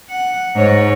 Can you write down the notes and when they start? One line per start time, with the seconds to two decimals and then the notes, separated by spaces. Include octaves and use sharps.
0.10 F#5
0.55 G#2 C#5